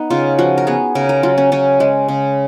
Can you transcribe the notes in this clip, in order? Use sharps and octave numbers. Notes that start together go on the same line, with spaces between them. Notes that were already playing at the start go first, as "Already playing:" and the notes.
Already playing: B3 D#4
C#3 F4
F3 F#4
A#4
B3 G#4
C#3 A#4
A#4
F#3 F4
C#4
C#3 C#4
G#3
C#3